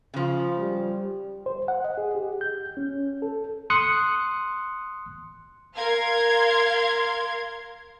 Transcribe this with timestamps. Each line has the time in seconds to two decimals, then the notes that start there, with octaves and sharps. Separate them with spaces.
0.14 C#3 F3
0.58 G3
1.46 C5
1.68 F#5
1.84 D#5
1.98 G#4
2.15 G4
2.41 G6
2.77 C#4
3.22 A4
3.70 C6 D#6 F#6 C#7
5.75 A#4 F5 C6 G#6